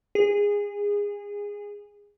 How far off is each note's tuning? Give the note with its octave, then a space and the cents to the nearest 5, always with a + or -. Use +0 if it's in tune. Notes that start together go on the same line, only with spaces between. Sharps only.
G#4 -25